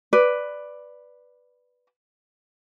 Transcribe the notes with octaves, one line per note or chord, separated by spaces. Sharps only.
B4 D5